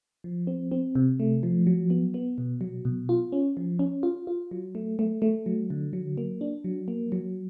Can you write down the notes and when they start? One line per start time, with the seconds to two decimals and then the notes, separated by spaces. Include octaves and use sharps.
0.24 F3
0.47 C4
0.71 C4
0.95 C3
1.20 A3
1.43 F3
1.67 F#3
1.90 B3
2.14 B3
2.38 B2
2.61 F#3
2.85 B2
3.09 F4
3.32 C#4
3.57 F3
3.79 C#4
4.03 F4
4.27 F4
4.51 F#3
4.75 A3
4.99 A3
5.22 A3
5.46 F#3
5.70 D3
5.93 F#3
6.17 A#3
6.41 D4
6.64 F#3
6.88 A#3
7.12 F#3